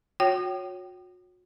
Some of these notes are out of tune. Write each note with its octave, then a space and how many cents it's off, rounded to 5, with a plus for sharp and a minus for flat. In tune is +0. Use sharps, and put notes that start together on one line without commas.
F#4 -35 C#5 +0 G5 -30